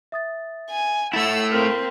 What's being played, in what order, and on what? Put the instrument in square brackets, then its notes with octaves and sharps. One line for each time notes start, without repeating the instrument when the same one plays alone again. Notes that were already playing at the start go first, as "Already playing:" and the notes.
[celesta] E5 D#6 A6
[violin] G#5
[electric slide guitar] A3 E4 [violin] F#5 E6 [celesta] A6
[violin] A#3 C4 [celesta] A#4 F6 B6